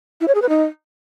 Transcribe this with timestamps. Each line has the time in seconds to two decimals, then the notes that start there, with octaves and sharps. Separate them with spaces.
0.21 E4
0.28 C#5
0.35 G#4
0.42 B4
0.49 D#4